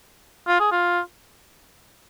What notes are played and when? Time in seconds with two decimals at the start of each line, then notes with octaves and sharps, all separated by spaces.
0.48 F4
0.60 G#4
0.71 F4